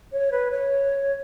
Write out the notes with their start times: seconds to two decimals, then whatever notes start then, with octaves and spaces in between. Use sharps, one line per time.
0.12 C#5
0.31 B4
0.51 C#5